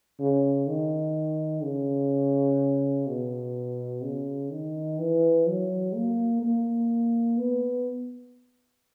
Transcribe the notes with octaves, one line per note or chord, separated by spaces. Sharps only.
C#3
D#3
C#3
B2
C#3
D#3
E3
F#3
A#3
A#3
B3